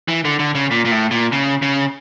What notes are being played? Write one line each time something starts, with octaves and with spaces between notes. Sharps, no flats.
E3
D3
D3
C#3
A#2
A#2
A2
A#2
C#3
C#3